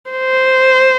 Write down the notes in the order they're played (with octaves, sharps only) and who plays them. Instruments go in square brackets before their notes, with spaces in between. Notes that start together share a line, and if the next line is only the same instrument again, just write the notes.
[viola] C5